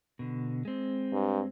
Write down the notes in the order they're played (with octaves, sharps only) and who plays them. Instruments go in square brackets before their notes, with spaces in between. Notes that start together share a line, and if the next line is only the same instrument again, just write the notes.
[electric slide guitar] B2 D3
G#3 C4
[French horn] G2